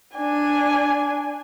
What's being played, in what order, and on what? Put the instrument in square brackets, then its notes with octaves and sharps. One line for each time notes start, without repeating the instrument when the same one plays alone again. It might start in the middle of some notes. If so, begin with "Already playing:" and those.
[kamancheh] D4 G#5